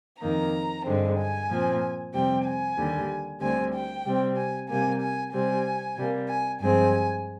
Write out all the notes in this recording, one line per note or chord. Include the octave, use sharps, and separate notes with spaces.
F2 D#3 A#3 A#5
G2 D3 G#3 C4
G#5
A#2 F3 C4
F2 C3 G3 C4 G5
G#5
D#2 D3 G3
D2 D3 G3 C4 G#5
G5
C3 G3 C4
G#5
C3 G3 A#3 G#5
G#5
C3 G3 C4 G#5
C3 G3 A#3
G#5
G2 F3 G#3 C4 G#5